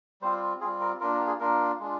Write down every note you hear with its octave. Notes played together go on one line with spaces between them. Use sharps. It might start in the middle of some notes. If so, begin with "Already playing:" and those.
G3 C4 F4 C5
G3 C4 F4 G#4
A#4
A#3 D4 F4 A#4
A#4
G4
G#4
A#3 D4 F4 A#4
G#3 D4 F4